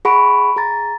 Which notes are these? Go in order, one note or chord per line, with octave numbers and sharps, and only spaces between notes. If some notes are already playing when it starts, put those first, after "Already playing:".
G#4 F#5 B5 C#6 D7
G#4 A#5 A6